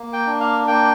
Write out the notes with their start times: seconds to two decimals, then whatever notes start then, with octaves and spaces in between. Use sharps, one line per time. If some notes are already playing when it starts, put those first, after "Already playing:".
Already playing: A#3
0.13 G5
0.26 D4
0.40 F5
0.67 A#3 G5